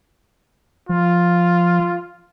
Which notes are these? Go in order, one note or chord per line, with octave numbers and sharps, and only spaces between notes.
F3 F4